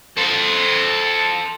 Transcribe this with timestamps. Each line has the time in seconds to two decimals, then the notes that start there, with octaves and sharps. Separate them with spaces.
0.17 A4 C5